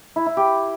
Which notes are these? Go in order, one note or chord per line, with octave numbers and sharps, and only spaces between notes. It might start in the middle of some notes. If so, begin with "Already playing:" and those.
E4
E4
G4